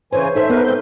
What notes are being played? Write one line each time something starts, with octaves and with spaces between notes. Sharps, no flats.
C#3 E3 C5 C#5 G#5
D#4 A4 C5 E5
B3 A#4 B4
G#2 C4 G6